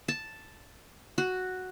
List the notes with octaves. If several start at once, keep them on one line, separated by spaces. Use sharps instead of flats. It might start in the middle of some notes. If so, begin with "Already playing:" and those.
A5
F#4